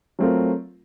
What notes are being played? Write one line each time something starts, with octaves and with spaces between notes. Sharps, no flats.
F#3 A3 C4 F4 A#4